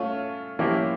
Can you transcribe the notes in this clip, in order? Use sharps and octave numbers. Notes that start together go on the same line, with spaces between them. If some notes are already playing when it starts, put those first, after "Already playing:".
Already playing: A3 C#4 F4
F3 A#3 C#4 E4 G4